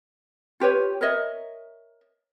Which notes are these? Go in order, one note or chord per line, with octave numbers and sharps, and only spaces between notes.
F4 G4 B4 C#5
A#4 C#5 D#5 E5